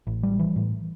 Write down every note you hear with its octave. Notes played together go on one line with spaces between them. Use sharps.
A1
G3
E3
A2